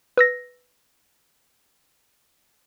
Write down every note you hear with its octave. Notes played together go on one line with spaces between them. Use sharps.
B4 E6 A#6